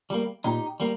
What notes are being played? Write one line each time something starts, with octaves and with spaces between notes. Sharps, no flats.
G3 A#3
A#2 D#4 G4
G3 A#3